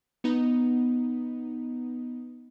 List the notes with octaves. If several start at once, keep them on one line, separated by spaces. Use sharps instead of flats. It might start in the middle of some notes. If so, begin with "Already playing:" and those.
B3 D#4